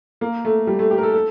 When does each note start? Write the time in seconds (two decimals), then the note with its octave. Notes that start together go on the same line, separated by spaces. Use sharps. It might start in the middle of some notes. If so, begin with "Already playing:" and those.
0.21 A#3
0.45 A3
0.67 G3
0.79 A3
0.91 G4
0.98 A#4
1.03 A4
1.13 A4